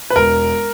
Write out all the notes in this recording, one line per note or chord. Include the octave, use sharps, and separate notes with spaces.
B4
E1 A#4